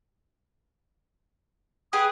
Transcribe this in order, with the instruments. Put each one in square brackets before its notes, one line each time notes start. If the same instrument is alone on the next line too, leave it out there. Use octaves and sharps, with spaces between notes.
[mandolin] G4 G#4 B4 [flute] D#6